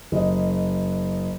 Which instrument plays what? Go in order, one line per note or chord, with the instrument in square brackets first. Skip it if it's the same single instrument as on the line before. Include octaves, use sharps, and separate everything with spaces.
[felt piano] F#1 D#5